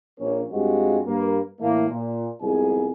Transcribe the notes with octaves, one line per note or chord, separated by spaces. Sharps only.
A#1 A#3 C#4
G2 G3 G#3 C4 F4 F#4
G2 A#3 B4
A2 E3 A3 A#3
A#2
C2 F2 G#2 B3 G#4 G#5